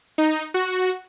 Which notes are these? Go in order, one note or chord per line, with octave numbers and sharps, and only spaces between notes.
D#4
F#4